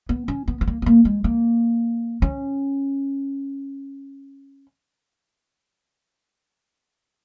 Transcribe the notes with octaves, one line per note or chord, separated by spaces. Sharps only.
B3
C#4
B3
B3
A#3
B3
A#3
G#3
A#3
C#4